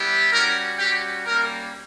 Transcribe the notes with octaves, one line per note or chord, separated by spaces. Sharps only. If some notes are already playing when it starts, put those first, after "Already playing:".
Already playing: G3 B3 E4 G4
G3 C#4 F#4 A#4
G3 C#4 F#4 G4
G3 A#3 C#4 A#4